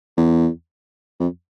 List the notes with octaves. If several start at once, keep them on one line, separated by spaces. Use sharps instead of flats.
E2
F2